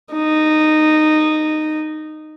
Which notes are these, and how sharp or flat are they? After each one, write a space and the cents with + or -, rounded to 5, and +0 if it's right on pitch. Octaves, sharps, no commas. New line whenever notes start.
D#4 -15